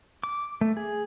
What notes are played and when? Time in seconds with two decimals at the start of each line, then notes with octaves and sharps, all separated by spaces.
0.24 D6
0.61 A3
0.77 G#4